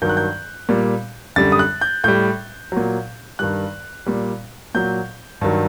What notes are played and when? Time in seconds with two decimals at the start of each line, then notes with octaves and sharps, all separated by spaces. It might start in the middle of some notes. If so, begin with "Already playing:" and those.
0.02 G2 D#3 F#3 G6
0.09 F#6
0.17 G6
0.69 A#2 G3
1.36 F#2 D3 G3 A6
1.52 D#6
1.59 F#6
1.81 G6
2.04 A2 G3 G6
2.72 A#2 F#3
3.39 G2 D#3 G3 F#6
4.06 A#2 G3
4.75 A#2 F#3 G6
5.41 G2 D#3 F#3